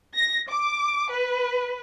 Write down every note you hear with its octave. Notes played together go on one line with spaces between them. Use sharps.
A#6
D6
B4